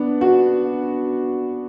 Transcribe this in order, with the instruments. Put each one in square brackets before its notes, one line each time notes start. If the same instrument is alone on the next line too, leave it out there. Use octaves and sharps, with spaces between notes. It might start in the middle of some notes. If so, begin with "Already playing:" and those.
Already playing: [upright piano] B3 D4
F#4